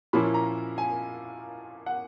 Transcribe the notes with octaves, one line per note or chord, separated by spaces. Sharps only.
A#2 F3 A#3 C#4 E4 B5
A#5
G#5
F#5